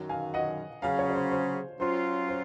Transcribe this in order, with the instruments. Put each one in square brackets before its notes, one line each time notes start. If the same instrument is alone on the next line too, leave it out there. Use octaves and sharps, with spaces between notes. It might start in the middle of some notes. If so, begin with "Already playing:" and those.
Already playing: [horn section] F#2 D#3 F#3
[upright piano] F5 G#5
D#5 F#5
[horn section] C#3 F#3 C#4 G#4 [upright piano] F5 G#5
[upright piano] C#5 F5
C#5
C5
C5
[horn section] F#3 C#4 F4 [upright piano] C5
[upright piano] C5